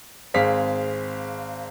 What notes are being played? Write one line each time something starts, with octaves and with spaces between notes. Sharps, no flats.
G#1 C4 G#4 F5 B6